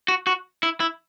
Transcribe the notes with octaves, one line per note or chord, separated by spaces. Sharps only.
F#4
F#4
E4
E4